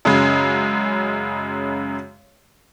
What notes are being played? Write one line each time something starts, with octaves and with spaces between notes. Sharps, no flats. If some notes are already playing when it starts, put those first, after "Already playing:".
F#2 C#3 G#3